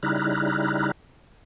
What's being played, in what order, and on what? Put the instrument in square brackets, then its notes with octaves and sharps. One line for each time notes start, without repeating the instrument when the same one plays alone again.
[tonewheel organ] C#3 G3 D#4 E4 F6 F#6